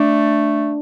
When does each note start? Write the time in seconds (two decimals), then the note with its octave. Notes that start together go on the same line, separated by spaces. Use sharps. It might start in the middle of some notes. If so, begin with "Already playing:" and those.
Already playing: A3 D4